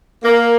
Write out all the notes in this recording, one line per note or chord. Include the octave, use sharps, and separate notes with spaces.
A#3